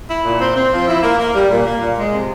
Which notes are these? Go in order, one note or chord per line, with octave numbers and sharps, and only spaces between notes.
E4
A#2
C4
C4
F3
E4
A#3
A#3
G3
A#2
A#3
A#2
G#3
C3